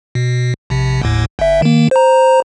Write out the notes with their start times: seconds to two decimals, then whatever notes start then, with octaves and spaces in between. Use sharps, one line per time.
0.15 B2
0.70 A#1 C3
1.02 G1 D#2 A2
1.39 G1 E5
1.62 D#3 A#3
1.91 C5 A#5